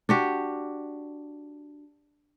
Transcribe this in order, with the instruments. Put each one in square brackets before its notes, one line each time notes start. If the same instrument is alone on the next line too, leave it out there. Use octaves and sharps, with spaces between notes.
[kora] D4 F#4 G4